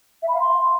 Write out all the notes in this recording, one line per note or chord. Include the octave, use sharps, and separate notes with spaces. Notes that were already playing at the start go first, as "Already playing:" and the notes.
E5
B5
F5
C6